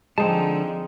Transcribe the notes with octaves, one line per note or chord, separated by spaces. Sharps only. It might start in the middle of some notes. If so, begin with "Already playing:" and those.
D3 F3 G#3 C4 D#4 A5